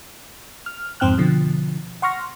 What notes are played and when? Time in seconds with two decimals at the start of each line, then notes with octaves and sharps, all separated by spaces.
0.66 F6
1.00 F2 G#2 C4 G5 F6 F#6
1.18 B2 D3 F3
2.02 F#5 C6 C#6 F6 A#6